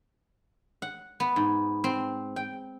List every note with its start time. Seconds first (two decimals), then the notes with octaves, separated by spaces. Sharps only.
0.82 F#5
1.20 B3
1.36 G#2
1.84 C4
2.36 G5